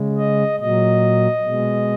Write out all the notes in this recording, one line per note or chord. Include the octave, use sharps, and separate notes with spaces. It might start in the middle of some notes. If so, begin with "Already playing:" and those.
Already playing: C#3 G#3
D#5
A#2 F#3 D#5
B2 G#3